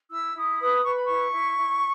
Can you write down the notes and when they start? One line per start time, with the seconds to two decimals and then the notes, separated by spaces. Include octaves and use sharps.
0.10 E4 E6
0.35 E4 D#6
0.60 B4 D#6
0.84 B4 C#6
0.95 B5
1.05 E4 C#6
1.33 E4
1.57 E4